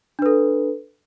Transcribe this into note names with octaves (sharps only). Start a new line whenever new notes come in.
D4 A4 B4